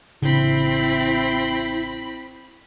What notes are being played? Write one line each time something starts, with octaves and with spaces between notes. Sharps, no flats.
A1 C#3 C4 D4 E4 B5